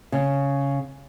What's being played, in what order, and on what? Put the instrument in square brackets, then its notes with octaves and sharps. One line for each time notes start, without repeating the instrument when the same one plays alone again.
[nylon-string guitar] C#3